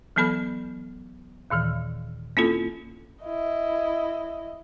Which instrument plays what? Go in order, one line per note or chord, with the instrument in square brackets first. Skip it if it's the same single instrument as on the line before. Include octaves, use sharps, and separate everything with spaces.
[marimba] E3 F#3 B3 A4 B5 F6
D#2 A#2 D#3 E3
A#3 C4 C#4 E4 F4 A4
[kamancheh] E4 D#5